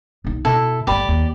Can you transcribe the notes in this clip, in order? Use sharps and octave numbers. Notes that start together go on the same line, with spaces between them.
B1 D#4
B2 E4 A4
G1 A3 G4 D5 B5
D#2